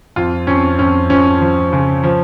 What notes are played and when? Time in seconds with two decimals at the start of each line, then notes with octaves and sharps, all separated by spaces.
0.16 F2 F4
0.47 F2 C#4
0.79 F2 C#4
1.10 F3 C#4
1.41 F3
1.73 C#3
2.03 F3